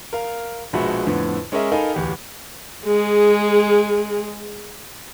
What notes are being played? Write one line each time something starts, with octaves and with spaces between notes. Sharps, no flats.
A#4 F5
A#1 B2 G#3 E5 F#5 B5
F2 A2 D3 B3
G#3 C#4 G#4 A#4 D#5 E5
D#4 A4 A#4 F5 G#5 B5
D1 E2 G4
G#3 G#4